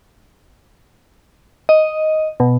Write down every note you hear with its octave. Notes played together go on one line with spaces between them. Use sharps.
D#5
B2